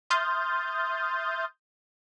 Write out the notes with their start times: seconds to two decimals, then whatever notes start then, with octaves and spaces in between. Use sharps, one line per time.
0.10 E5 C6 D#6 F6 G6 A6